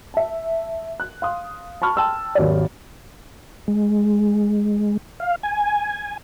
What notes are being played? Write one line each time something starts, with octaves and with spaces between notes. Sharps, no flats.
E5 A5
F#6
F5 C6 D#6
A5 B5 C#6 F6
G5 A5 C6 E6 F6
G#1 D#2 F#3 C#5 D5
G#3
F5
G#5